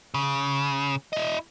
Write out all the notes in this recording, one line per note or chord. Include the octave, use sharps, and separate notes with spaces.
C#3
E4 D#5